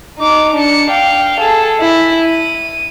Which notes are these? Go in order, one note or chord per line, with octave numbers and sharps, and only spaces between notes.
D#4 D6
D4 C#7
F5 G5
G#4 A4
E4
D#7